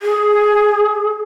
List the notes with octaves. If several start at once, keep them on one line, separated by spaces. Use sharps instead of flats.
G#4